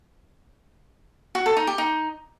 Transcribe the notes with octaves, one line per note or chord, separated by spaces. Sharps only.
F#4
A4
D#4
G4
D#4